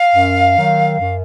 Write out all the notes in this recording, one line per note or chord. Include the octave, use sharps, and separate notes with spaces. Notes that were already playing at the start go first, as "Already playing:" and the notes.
Already playing: F5
F#2
D#3 F#3
F#2